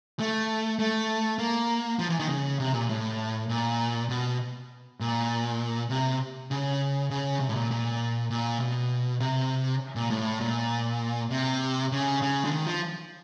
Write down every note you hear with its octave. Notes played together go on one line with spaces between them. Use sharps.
A3
A3
A#3
F3
E3
D#3
C#3
C3
A#2
A2
A#2
B2
A#2
C3
C#3
C#3
C3
A2
A#2
A#2
A#2
B2
C3
A#2
A2
A#2
C3
C#3
C#3
D3
D#3
F3